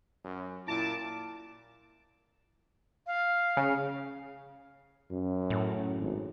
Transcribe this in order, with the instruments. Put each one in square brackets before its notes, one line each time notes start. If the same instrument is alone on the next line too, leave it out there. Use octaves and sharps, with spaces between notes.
[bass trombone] F#2
[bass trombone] A#2 [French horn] E4 [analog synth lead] A5 [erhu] D6
[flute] F5
[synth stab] C#3
[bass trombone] F#2
[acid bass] A2
[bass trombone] G#1